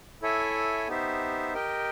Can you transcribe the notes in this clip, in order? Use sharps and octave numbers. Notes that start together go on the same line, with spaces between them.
E4 A4 C#5 E5 G#5
B3 D#4 G4 C5 E5
G4 A#4 D#5 G5